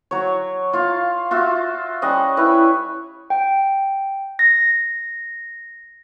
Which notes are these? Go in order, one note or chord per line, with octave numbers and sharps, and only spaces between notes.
F#3 C#5
F4 F5
F4 F#4 E5
G3 C#4 D#5 F#5
E4 B4 C#5
G5
A#6